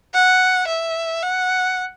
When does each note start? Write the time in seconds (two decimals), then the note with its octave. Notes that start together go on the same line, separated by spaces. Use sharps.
0.14 F#5
0.67 E5
1.22 F#5